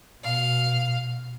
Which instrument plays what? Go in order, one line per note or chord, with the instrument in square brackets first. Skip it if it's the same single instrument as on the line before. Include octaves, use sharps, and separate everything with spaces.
[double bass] B2 [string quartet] F5